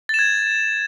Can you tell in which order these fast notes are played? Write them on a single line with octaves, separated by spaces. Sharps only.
A6 E7 G#6